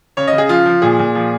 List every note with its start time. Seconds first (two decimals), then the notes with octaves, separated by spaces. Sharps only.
0.17 C#3 C#5
0.28 D#5
0.33 C#3
0.38 G#4
0.49 F3 F4
0.66 F3
0.82 A#2 G#4
0.99 A#2
1.15 F3